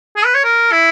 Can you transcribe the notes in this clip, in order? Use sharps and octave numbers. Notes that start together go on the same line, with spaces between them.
G#4
B4
C#5
A#4
E4